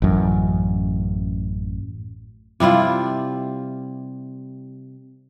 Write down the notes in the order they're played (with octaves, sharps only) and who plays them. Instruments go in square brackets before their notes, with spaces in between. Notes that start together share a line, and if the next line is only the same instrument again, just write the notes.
[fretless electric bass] A1 F#2
[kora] C3 G3 E4 F4